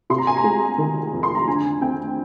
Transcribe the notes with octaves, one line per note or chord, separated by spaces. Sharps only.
C3 C6
A#5
G#5
A#5
G#3
D#3
F2
C6
A#5
D3 G#5
C4 G5